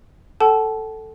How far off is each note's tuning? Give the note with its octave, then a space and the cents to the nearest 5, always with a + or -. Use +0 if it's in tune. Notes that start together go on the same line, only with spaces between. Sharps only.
A4 +0 F#5 +45 A5 -30